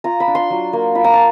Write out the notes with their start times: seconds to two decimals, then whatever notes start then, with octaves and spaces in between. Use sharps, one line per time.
0.04 F4 A#5
0.20 B5
0.28 D4
0.35 C6
0.50 F#3
0.73 A#3
0.95 F4 B5
1.04 A#5
1.14 A5